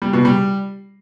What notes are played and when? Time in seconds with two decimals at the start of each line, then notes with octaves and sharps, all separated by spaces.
0.02 G3
0.13 B2
0.25 G3